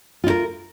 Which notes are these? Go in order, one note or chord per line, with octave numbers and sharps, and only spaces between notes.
E4 F4 A#4